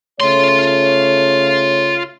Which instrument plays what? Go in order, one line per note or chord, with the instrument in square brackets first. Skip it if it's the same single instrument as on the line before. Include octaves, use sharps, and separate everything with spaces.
[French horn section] C#3 A3 C#5 [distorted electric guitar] F4 C6